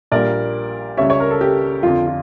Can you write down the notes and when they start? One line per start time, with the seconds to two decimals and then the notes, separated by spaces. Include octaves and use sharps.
0.11 A#1 A#2 G3 A#4 D5
0.97 C#2 C#3 G3 C#5 E5
1.10 C#5
1.20 A#4
1.31 A4
1.41 G4
1.83 F2 D3 F3 F4
2.07 F4